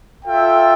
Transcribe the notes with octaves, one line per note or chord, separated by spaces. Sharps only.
F4 A4 E5 G5